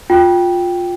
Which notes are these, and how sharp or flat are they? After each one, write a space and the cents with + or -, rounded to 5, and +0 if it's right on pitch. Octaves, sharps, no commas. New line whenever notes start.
F4 +15 G5 +0